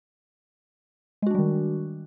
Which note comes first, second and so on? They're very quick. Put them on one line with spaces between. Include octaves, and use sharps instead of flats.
G#3 F#4 D4 G3 D#3